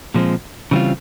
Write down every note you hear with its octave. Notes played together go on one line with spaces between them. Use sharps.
A#2 F3 G#3 C4
C#3 E3 G3 C4 F4